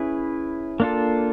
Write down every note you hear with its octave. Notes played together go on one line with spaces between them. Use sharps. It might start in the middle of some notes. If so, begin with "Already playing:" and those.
Already playing: C#4 E4 G#4 B4
A#3 D4 F4 A4